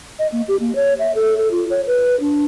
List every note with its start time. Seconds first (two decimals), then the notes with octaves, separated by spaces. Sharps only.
0.19 D#5
0.32 A#3
0.48 G4
0.60 A#3
0.76 C#5
0.99 E5
1.15 A4
1.38 A4
1.51 F4
1.70 C#5
1.87 B4
2.20 D4